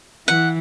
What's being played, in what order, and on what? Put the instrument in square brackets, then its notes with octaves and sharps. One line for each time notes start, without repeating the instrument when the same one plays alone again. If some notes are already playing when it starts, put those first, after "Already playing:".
[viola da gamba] E3 [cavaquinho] F#5